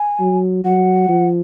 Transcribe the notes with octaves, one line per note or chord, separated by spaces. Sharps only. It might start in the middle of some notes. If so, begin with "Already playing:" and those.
Already playing: G#5
F#3
F#3 F#5
F3